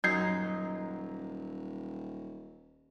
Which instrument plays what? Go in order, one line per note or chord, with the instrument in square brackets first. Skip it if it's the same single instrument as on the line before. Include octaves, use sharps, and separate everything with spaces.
[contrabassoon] D#1 [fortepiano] F#2 [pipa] D#4 [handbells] G6 G#6 C7